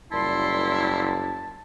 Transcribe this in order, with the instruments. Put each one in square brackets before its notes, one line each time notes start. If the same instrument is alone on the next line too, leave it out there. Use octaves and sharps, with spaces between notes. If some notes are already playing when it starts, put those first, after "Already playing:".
[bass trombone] F#1 [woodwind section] A#2 G3 C6 [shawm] E4 [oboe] A5